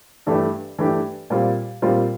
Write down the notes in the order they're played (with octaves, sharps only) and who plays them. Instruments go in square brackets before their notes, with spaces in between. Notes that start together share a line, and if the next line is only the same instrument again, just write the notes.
[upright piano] G2 E3 A3 D4 G4
G2 E3 A3 D4 G4
A#2 G3 C4 F4
A#2 G3 C4 F4